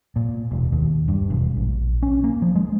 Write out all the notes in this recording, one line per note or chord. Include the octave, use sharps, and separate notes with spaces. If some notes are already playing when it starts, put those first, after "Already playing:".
A#2
E1
D#2
G2
E1
A#1
C#4
A#3
F3
G#3